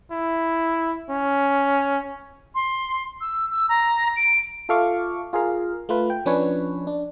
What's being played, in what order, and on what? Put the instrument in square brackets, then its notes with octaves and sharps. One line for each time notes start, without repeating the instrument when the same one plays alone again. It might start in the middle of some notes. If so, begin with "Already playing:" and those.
[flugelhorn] E4
C#4
[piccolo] C6
E6
E6
A#5
D7
[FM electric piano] F4 A4 E5 F5 C#6 D6
F4 G#4 A#4 F5
A3 F4 B4
G5
F3 C#4 D4 B4 C#5
D4